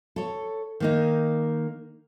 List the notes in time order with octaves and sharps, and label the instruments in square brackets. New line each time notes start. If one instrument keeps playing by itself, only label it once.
[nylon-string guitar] A4 C#5
D#3 A#3 D#4